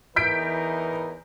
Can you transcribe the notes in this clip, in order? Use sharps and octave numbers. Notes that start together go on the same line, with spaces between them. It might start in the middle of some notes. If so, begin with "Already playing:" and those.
E2 E3 D#4 A#4 G6 B6 D7